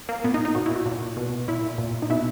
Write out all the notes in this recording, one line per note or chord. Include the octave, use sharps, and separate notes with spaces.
A#3
A#2 B3
D#4
D#4
A#2 F#4
E4
F#4
A#2
B2
A#2 E4
A#2
D#4
B2 E4